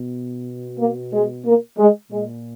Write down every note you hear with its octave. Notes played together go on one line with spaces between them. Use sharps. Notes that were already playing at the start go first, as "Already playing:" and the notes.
Already playing: B2
A#3
G#3
A#3
G#3
A#2 G#3